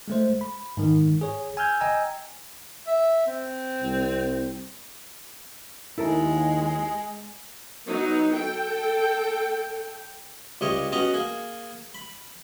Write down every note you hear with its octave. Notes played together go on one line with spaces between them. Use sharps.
G#3 A3 C5
B5
G#2 D#3
G#4 C#5
G#5 E6 F6 G6 G#6
D#5 G5 G#5 A#5 E6
E5
C4
C2
D#2 G#3 E4 A4 A#4
F#3 B3 D#4
A4 G5
C#2 G3 C#5 D#5
B3 C#4 F#4 D#5 A#5
A#3 G#4
B5